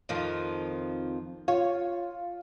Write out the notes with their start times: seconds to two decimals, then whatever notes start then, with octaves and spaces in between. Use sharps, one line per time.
0.09 F2 D#3 F3
1.48 F4 C#5